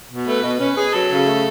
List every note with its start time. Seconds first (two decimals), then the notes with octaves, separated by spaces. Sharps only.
0.10 B2
0.26 A3 B4
0.43 B2
0.59 C#4 B4
0.76 G#4
0.93 F#3 A4
1.10 C#3
1.26 A3